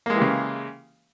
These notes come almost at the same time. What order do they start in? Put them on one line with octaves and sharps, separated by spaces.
A#3 G#3 E3 G4 C#3